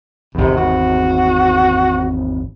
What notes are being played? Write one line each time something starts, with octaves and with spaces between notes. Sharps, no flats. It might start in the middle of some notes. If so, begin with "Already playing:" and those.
G#1 E2 C3
F#4